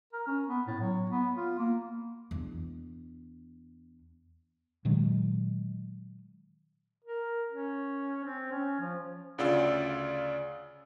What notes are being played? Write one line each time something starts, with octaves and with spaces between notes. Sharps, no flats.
A#4
C#4
B3
A2
F#3
B3
F4
A#3
E2 D4
A#2 D#3 F#3 G#3
A#4
C#4
C4
C#4
F3
D2 C#3 F4 D5 E6